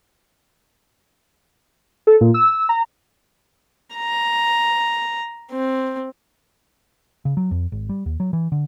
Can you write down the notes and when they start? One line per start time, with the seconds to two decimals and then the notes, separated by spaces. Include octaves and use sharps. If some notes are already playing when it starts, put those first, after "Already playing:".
2.07 A4
2.21 A#2
2.34 E6
2.69 A#5
3.96 A#5
5.52 C4
7.25 C#3
7.37 F#3
7.51 F2
7.72 G#1
7.89 G3
8.06 D#2
8.20 F#3
8.33 E3
8.52 D3